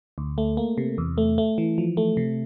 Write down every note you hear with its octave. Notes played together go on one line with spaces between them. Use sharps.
D2
A3
A#3
C3
E2
A3
A3
E3
F3
A3
C3